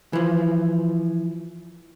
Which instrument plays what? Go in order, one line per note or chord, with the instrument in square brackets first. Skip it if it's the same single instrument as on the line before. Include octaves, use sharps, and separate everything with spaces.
[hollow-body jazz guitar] E3 F3